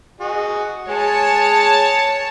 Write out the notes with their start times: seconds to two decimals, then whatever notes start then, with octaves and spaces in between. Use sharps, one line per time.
0.20 F#4 G#4 D#5
0.89 G#3 G#4 C#5 A5